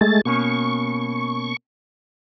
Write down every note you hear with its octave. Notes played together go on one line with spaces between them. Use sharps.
G#3 A3 A6
B2 A#3 C#4 C#6